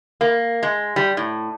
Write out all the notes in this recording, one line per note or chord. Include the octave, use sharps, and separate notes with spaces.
A#3
G#3
G3
A2